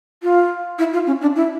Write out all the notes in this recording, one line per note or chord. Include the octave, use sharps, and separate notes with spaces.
F4
E4
F4
C#4
D4
E4